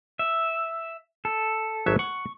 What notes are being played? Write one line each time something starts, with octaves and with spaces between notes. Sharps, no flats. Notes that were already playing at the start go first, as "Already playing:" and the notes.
E5
A4
G#1 F#3 E5
F#5 C#6